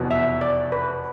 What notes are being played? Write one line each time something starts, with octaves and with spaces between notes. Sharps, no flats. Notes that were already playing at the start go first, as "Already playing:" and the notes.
Already playing: F1 E2 B2 B3
E5
D5
B4